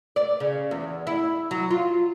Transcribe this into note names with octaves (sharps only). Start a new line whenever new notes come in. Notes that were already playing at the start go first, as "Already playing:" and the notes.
D5
C#3
E2
E4
F#3
F4